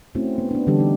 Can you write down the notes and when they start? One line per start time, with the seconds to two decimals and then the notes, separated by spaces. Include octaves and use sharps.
0.15 A3 C4 C#4 E4 F#4
0.38 B3
0.51 B3 D4
0.67 D3 E3 G3 D4 G4 A4
0.80 D#4